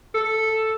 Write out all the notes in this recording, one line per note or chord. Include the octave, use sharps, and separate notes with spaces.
A4